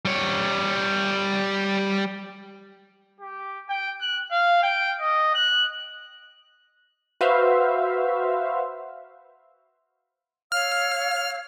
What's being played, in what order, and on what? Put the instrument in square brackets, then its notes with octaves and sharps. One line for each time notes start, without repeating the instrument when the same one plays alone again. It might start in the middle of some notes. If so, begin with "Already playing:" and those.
[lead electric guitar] G3 C#5
[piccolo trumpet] G4
G5
F#6
F5
G5
D#5
F#6
[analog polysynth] F#4 B4 C5 E5 F5
[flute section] C#5 F5 E6 [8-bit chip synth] F6